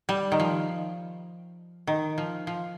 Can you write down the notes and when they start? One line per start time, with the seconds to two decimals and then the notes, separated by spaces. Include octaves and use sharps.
0.09 G3
0.32 D#3
0.40 F3
1.87 D#3
2.18 F3
2.47 F3